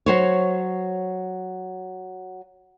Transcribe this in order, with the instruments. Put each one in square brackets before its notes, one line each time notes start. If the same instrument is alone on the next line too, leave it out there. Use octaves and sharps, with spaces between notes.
[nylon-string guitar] F#3 C5 C#5